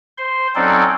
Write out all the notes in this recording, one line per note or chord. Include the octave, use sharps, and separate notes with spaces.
C5 C6
F#3 C4 C#4 D#4 A4 D5